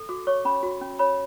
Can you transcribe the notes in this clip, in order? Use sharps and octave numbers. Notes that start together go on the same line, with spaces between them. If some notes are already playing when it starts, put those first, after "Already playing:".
Already playing: A4
F#4 D6
C#5 C#6
C#4 B5
F#4
C#4
C#5 B5